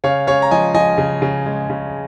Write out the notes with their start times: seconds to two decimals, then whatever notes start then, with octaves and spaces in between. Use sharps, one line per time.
0.04 C#3 C#5 F5
0.27 C#3 C#5 F5
0.42 A#5
0.51 F3 D#5 G#5
0.74 F3 D#5 G#5
0.98 C#3
1.22 C#3
1.46 G#3
1.70 C#3